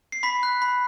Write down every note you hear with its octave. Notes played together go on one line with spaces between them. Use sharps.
C7
B5 B6
F#6
B5